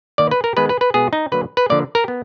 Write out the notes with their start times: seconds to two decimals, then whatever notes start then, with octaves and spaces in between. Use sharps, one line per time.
0.18 D#3 A#3 D5
0.31 B4
0.44 A#4
0.57 D#3 G#3 B3 B4
0.69 B4
0.81 B4
0.94 B2 G#3 B3 G#4
1.13 D#4
1.32 D3 F#3 A#3 B4
1.57 B4
1.70 D3 F3 A#3 D5
1.95 A#4
2.08 B3